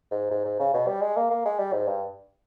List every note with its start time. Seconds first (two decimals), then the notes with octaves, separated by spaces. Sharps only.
0.11 G#2
0.31 G#2
0.45 G#2
0.59 C#3
0.74 B2
0.87 G3
1.01 G#3
1.16 A#3
1.30 A#3
1.45 G#3
1.59 G3
1.73 G#2
1.87 G2